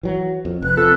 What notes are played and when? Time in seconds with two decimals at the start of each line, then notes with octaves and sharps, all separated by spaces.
0.03 E3 F#3
0.45 F2
0.62 F1 B4 F#6
0.77 F2 A4